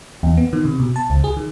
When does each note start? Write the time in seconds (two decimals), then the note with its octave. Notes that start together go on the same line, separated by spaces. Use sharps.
0.23 E2
0.37 B3
0.53 D#3
0.65 C3
0.80 B2
0.96 A5
1.10 C#2
1.24 G#4
1.37 D#3